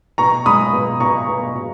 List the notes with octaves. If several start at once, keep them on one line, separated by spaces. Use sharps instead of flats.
B2 A#5 C#6
G#3 B5 D#6
B2
B2 A#5 C#6
B2
B2